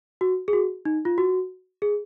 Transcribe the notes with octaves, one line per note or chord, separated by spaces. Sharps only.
F#4
G#4
F#4
D#4
F4
F#4
G#4